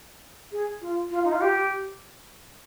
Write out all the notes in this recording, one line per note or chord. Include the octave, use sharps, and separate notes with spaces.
G#4
F4
F4
D#4
F4
G4